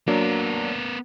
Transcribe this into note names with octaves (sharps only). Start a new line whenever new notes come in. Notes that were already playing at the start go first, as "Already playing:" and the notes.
F#3 A#3 B3 D4 A#4